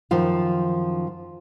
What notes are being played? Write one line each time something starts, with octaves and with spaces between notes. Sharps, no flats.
F#2 D#3 F3 F4